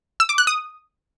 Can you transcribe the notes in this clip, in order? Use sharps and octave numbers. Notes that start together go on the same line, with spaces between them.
E6
D6
F#6
D#6